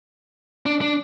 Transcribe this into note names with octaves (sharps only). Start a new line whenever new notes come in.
D4
D4